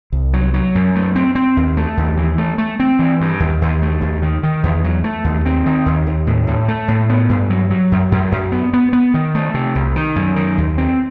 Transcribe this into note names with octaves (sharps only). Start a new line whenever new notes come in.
C2
F#3
F#3
F#2
A3
C4
C4
D#2
A3
D#2
E3
A3
A3
C4
E3
G2
D#2
D#2
A3
D#2
D#3
D#3
E2
F#3
A3
D#2
C4
D#3
D#2
D#2
A2
A2
A3
A2
B3
G2
F#3
F#3
F#2
F#2
F#2
B3
B3
B3
D#3
A3
C3
C2
D#3
F#2
D#3
D#2
C4